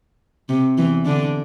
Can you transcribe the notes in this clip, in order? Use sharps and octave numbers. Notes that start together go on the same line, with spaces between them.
C3
E2 E3
D3 D4